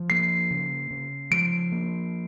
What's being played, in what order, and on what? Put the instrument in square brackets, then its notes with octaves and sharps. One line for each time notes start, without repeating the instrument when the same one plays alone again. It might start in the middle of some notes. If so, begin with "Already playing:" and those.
Already playing: [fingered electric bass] F3
[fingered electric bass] A#3 [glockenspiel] C7
[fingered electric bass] C#3
C#3
[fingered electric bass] F3 [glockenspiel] D7
[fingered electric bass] A#3